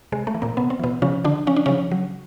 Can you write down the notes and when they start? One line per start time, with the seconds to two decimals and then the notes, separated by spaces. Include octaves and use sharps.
0.12 C3 G#3
0.27 A3
0.34 E3
0.42 A#2 A#3
0.57 C3 B3
0.70 C4
0.79 B2 E3 B3
1.02 C#3 F3 C#4
1.24 D3 F3 D4
1.47 F3 C#4
1.56 D4
1.66 C#3 F3 C#4
1.91 F#3